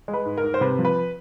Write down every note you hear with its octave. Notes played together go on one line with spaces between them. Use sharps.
G#3
B4
G#2
A#4
G#2
C5
C3 B4
F3
B4